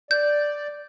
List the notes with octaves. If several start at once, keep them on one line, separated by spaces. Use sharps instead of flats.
D5 G6